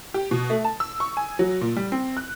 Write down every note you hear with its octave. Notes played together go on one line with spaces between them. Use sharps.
G4
B2
A3
A5
E6
C#6
G#5
F#3
A#2
G3
C4
F#6